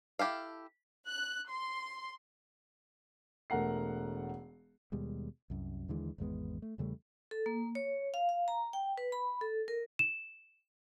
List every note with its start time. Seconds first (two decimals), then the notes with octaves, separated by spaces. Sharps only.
0.19 E4 G4 A4 F5
1.09 F#6
1.50 C6
3.50 E1 A3 A#4 F#5 C7
4.92 D#2 B2 G3 G#3
5.50 C2 F#2
5.88 D#2 D3 E3 G#3
6.18 G#1 E2 G#3 B3
6.62 A3
6.78 E2 C#3 G3 A3
7.31 A4
7.46 A#3
7.75 C#5
8.14 F5
8.29 F5
8.48 A#5
8.73 G5
8.98 B4
9.12 B5
9.41 A4
9.68 A#4
9.99 E7